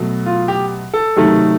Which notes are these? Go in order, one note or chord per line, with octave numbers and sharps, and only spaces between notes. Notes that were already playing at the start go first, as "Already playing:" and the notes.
Already playing: B2 F#3 A3
F4
G4
A4
C3 D#3 F#3 A3